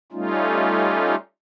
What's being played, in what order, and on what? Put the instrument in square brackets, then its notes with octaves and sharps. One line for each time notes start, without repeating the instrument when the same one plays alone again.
[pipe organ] G3 A3 C#4 D#4 F4